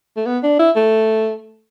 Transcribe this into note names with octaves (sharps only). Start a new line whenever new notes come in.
A3
B3
D4
E4
A3